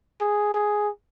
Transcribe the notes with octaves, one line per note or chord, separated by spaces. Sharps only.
G#4
G#4